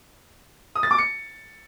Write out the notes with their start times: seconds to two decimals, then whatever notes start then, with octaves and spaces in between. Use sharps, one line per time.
0.75 D#6
0.83 A6
0.91 D6
0.98 C#7